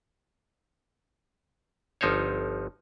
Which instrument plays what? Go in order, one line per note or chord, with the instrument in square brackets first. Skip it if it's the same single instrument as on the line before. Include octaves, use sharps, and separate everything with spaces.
[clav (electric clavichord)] G1 F3 D#4 C5 C#5